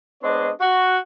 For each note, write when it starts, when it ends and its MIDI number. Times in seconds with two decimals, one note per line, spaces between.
0.23 0.50 56
0.23 0.50 59
0.23 0.50 60
0.23 0.50 62
0.23 0.50 73
0.23 0.50 75
0.60 0.98 66